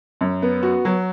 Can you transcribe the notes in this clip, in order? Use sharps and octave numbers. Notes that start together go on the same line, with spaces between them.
F#2
B3
F#4
F#3